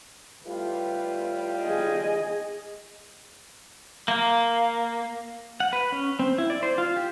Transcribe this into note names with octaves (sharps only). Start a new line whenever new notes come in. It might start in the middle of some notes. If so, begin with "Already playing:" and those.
A2 G3 F4 B4
G#4 D#5
A#3
F#5
B4
C#4
C4
E4
D5
C5
F4
G4